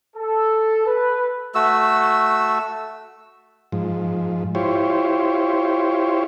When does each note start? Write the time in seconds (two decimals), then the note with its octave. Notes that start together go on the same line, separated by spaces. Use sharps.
0.16 A4
0.86 B4
1.55 A3 F#4 E6
3.72 G#2 F3
4.55 E4 F4 G4 C5 C#5